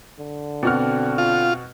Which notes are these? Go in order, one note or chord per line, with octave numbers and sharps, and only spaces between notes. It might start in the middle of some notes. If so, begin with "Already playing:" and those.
D3
B2 C4 F#4 F6
F4